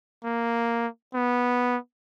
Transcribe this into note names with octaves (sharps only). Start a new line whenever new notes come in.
A#3
B3